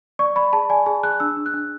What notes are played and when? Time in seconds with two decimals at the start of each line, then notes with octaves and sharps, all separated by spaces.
0.19 D5 C#6
0.36 D5 B5
0.53 G#4 A5
0.70 D5 G#5
0.86 G#4 A5
1.03 G#4 F#6
1.20 D4 E6
1.37 D4
1.46 F#6
1.54 D4